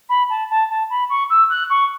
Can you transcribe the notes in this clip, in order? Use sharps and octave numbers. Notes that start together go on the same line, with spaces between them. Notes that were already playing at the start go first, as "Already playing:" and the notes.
B5
A5
A5
A5
B5
C#6
E6
F#6
C#6